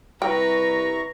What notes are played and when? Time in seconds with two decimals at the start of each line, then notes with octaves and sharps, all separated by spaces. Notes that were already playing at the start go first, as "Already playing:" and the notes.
0.22 C2 G3 E4 B4 G5 A#5 C#6